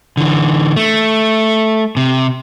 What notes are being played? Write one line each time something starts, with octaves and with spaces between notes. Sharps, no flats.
D3 E3
A3
C3